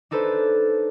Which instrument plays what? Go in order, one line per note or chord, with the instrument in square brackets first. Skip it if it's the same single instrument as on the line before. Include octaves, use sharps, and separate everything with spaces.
[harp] D4 D#4 A4 B4 C5